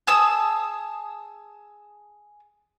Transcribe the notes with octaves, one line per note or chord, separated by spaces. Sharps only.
G#4 A5 D#6 E6